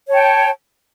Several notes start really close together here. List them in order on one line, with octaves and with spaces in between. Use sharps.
C#5 A5 G5